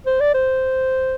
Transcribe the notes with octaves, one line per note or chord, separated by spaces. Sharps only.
C5
D5
C5